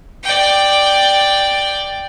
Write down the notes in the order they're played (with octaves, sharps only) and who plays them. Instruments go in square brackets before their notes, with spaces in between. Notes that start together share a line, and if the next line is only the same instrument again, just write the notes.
[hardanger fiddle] D5 G5